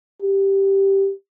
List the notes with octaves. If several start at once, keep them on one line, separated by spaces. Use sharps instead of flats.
G4